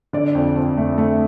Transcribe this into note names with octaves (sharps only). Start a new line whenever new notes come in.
D3 D5
F2
F2
A3
A3